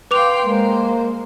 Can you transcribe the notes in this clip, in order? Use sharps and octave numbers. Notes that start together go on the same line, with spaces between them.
B4 F5 G5 C6 D6 F7
G#3 A#3 C5